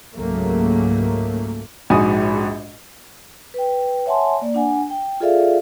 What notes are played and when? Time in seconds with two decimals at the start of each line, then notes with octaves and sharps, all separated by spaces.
0.15 C#2 G#2 C#3 F#3 A3 A#3
1.90 A#1 G#2 F#4 G#5 B5 D#6
3.54 B4 G5
4.06 C#5 E5 F#5 G#5 A5 C6
4.42 A#3 D5
4.54 D4 F#5 G#5
4.90 G5
5.20 F4 G#4 A4 D5 E5 F5